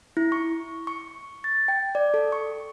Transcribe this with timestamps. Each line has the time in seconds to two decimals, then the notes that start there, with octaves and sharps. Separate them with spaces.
0.17 E4
0.32 C#6
0.87 C#6
1.44 A6
1.68 G5
1.95 D5
2.14 A4
2.32 C#6